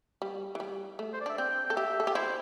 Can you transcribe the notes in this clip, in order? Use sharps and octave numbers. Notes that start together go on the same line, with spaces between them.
G3
E3
G3
A3
C5
D5
D4 E5
C4 G5
A4 G5
G4 E5
A4
G4
E4 C5